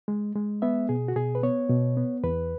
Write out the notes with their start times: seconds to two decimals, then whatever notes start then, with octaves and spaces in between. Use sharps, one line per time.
0.08 G#3
0.35 G#3
0.62 B3 E5
0.89 B2 G#4
1.08 F#4
1.16 B2 G#4
1.35 B4
1.43 B3 C#5
1.70 B2
1.97 B3
2.24 E2 B4